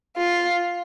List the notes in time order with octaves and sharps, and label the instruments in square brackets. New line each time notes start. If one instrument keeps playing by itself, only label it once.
[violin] F4